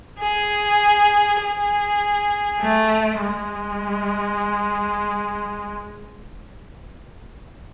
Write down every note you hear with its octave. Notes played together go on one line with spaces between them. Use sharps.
G#4
G#4
A3
G#3